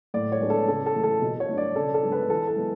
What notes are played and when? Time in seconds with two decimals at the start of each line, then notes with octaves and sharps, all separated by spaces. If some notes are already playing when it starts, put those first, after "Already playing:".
0.14 A2 D5
0.32 C#5
0.41 G#3 B3 D4
0.50 A4
0.68 C#3 A4
0.86 A4
0.95 E3 A3
1.03 A4
1.22 B2
1.40 C#5
1.49 A3 D4
1.58 D5
1.76 C#3 A4
1.94 A4
2.03 G#3 B3 D4
2.12 B4
2.30 E3 A4
2.48 A4
2.56 G#3 B3